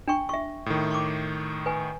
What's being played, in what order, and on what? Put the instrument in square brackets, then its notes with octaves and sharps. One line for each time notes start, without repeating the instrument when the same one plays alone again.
[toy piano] D4 G5 C#6
E5 C#6
[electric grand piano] A2 D#3
[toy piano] C#6 D6
B4 G#5